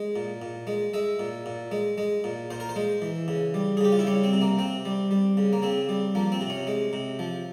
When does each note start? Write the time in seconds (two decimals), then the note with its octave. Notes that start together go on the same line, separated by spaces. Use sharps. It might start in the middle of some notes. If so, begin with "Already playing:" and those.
Already playing: G#3
0.16 A#2
0.42 A#2
0.67 G#3
0.93 G#3 E5
1.19 A#2
1.46 A#2
1.71 G#3
1.98 G#3
2.24 A#2
2.50 A#2 C5
2.60 A#4
2.69 C5
2.76 G#3
3.02 E3
3.28 C#3
3.54 G3
3.77 G#4
3.81 C#3 G4
3.92 F4
3.99 E4
4.07 G3 C#4
4.24 C4
4.33 C3
4.41 A#3
4.59 C3 C4
4.85 G3
5.11 G3
5.37 C#3
5.53 A#3
5.62 C#3 C4
5.89 G3
6.15 F3 A#3
6.32 C4
6.41 C3
6.50 C#4
6.67 G#3
6.93 C3
7.19 F3